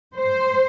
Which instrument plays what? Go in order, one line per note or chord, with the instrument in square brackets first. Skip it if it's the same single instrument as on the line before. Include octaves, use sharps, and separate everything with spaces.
[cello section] C5